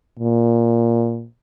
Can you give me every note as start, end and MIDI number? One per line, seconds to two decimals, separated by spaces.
0.19 1.26 46